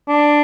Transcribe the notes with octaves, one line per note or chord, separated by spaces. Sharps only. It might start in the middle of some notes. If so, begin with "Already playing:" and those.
D4